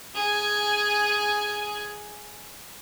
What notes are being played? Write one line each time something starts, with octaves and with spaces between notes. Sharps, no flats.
G#4 G#5